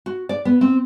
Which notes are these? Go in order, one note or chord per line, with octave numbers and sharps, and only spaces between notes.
F#4
D5
B3
C4